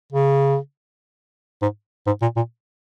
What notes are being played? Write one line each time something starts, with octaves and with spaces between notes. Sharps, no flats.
C#3
G#2
G#2
A#2
A#2